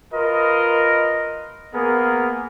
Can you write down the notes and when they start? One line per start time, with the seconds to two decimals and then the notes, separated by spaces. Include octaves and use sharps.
0.13 F4 A#4 B4 D#5
1.74 A#3 B3 G#4 A#4